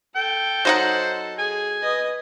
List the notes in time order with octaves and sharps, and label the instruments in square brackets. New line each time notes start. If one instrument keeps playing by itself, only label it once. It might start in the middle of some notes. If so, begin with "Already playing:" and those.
[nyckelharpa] A4 [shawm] G5
[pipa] F#3 D#4 F#5 [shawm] C5
[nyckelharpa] G#4 [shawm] G#5
[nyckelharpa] B4 D#5